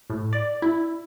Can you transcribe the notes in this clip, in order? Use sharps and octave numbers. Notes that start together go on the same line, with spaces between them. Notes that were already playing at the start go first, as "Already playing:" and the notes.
A2
D5
E4